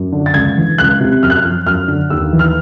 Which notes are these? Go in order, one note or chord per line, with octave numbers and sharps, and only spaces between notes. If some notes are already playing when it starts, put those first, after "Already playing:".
Already playing: F#2
D3
A6
C#2 G#6
E3
C#2 F#6
C3
F#2 F6
F#6
F6
F3
F#2 F6
D3
D#2 E6
E3
F6